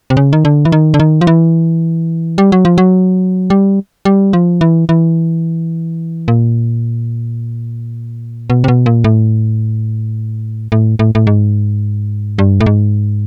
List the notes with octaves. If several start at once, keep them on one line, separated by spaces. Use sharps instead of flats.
C3
C#3
D#3
D3
E3
D#3
D3
D#3
F3
E3
G3
F#3
F3
F#3
G3
G3
F3
E3
E3
A#2
B2
C3
B2
A#2
A2
A2
A2
A2
G#2
G2
A2
G#2